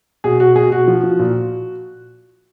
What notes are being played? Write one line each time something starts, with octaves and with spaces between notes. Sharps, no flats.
B2 G#4
B2 F#4
B2 G#4
B2 F#4
F3
F3
A#2